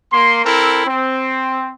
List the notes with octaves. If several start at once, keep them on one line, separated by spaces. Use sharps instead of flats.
A#3 C6
C4 E4 A4 A#4
C4